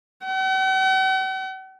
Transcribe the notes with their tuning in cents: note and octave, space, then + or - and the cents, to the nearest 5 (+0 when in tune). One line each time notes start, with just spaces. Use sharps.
F#5 +45